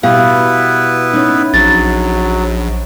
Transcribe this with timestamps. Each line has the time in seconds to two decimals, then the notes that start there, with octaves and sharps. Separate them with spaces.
0.03 B2 G3 B3 E4 G4 B4 F5
1.13 C#4 D#4
1.54 A#1 F#3 A6